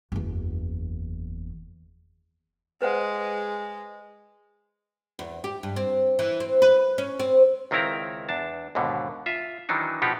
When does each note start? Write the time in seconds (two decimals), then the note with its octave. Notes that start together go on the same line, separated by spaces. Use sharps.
0.12 F#1 E2
2.82 G#3 B4 C5 F#5
5.19 E2
5.44 G4
5.63 G2
5.76 C4
6.19 E3
6.40 C4
6.62 B4
6.98 C#4
7.19 C4
7.71 C#2 D#3 C4 E4 A#4 A#5
8.29 E2 D4 A5
8.75 D#2 G#2 B2 D3
9.26 F4 E5
9.69 D#3 E3 F#3 D4 D#4
10.02 B2 F3 B3 D#4 G4